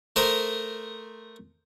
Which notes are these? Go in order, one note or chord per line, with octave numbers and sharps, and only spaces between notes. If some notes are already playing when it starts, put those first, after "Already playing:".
A3 A#4 C5 A#5 D#6